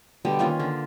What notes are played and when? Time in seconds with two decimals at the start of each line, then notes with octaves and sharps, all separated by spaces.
0.25 B2 D3 G3
0.39 D#3 A#3 C#4 F4
0.60 D3